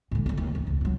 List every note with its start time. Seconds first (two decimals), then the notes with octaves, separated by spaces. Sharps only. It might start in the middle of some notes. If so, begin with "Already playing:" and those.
0.11 G#2 D3
0.26 D2 G#2
0.37 D#2
0.55 F#2
0.67 C#2
0.81 F3 F#3